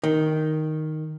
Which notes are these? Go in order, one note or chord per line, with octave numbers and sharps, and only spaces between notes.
D#3